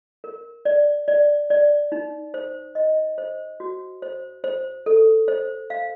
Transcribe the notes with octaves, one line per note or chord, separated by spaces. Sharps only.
A#4
D5
D5
D5
D#4
C5
D#5
C5
F#4
C5
C5
A4
C5
F5